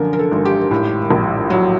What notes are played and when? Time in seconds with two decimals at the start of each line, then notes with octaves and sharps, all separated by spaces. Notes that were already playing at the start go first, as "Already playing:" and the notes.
Already playing: F#2 D3 F3 A#4
0.13 A#4
0.19 A4
0.31 G#1
0.45 G4
0.71 A2
1.10 A#1
1.50 F#3